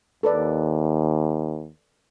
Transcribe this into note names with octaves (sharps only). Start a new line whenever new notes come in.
D#2 A4 B4 D5